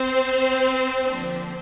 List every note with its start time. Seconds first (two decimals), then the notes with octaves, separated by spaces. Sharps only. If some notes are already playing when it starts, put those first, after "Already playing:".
Already playing: C4 C5
1.07 D3 F3 A#3 D4